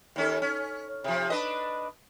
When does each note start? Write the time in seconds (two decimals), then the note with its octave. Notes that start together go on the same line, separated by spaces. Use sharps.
0.16 D#2 C#4 A4
0.42 C#4
1.04 C3 F3
1.30 D4 B4 D#5